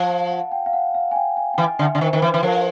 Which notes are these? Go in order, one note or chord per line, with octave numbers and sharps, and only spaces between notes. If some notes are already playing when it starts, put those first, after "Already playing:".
Already playing: F3 A5
F5
F#5
G5
F5
F#5
F5
G#5
G5
G#5
G5
E3 G#5
D3 E5
D3
D#3 C5
D#3 C5
E3 B4
E3
F3 A#4